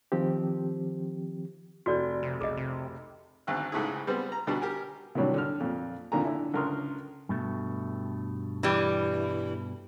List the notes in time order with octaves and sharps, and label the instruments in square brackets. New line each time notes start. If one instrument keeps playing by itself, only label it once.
[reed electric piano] D#3 F3 C4 G4
[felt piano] F1 [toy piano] F#4 D5
[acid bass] C3
[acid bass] B1 [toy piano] G#4 D#5
[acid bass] C3
[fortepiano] G#1 D2 F#6
C#2 G#2 A3 E4 G#4
G3 G#3 B3 C4
A#5
D2 B2 D3 G3 D4
G4 A#4 G#5
C3 D#3 E3 F#3 G3 D4
D3 F6
F2 A#2
F2 A#2 D3 D#3 G#5 A#5
D3 E4
C#2 D3 A#4 C6 D#6
[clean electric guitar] G2 B2 A3
[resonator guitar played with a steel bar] E3 G3